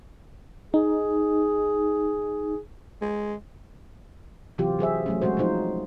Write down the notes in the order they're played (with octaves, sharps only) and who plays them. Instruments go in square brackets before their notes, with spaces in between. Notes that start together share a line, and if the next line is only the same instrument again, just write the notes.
[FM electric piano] D#4 [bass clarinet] G#4
[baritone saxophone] G#3
[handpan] C3 E3 F#3 C4 F4 G4
F#3 G#4 C5 E5
F#3 A3 C#4
F#3 G#3 C4 F#4 C5
F3 F#3 D#4 F4 C5